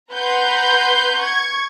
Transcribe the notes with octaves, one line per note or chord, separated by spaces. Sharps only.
B4 F#5 A#5 C6 G6
C#6 G#6